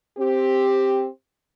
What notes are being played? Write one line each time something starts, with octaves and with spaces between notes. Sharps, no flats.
C4 G4